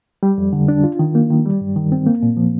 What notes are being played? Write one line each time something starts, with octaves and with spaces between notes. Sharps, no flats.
G3
F2
D3
D4
F4
D#3
A#3
D#3
G3
G2
D#3
C4
A#3
A#2
F3